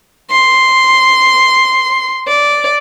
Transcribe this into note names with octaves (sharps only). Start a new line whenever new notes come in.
C6
D5